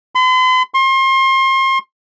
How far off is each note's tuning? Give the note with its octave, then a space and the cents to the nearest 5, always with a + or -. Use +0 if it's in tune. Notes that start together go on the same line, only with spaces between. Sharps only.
C6 -45
C6 +35